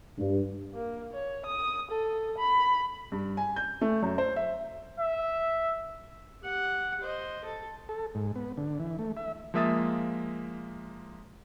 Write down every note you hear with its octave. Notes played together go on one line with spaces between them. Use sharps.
G2
A#3
C#5
D#6
A4
B5
G2
G#5
G6
A3
F#2
C5
E5
E5
G4 F#5
C5 D#5
A4
A4
G#2
B3
D3
E3
A3
E5
F3 G#3 A#3 E5 D#6 A6